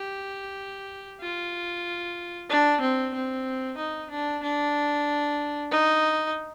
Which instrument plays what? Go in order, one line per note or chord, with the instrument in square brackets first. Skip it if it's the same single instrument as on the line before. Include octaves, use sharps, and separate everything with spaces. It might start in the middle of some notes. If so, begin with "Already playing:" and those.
Already playing: [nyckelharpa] G4
F4
D4
C4
C4
D#4
D4
D4
D#4